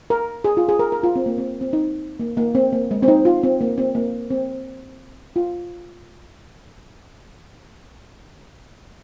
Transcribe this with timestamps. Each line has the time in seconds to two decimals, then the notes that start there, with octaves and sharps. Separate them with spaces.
0.10 A#4
0.44 G#4
0.57 F4
0.69 G#4
0.79 A#4
0.92 A#4
1.03 F4
1.16 C4
1.26 A#3
1.38 C4
1.61 C4
1.73 D#4
2.20 A#3
2.37 A#3
2.55 C4
2.72 A#3
2.91 G#3
3.03 C4
3.08 D#4
3.25 F4
3.43 C4
3.61 A#3
3.78 C4
3.95 A#3
4.30 C4
5.36 F4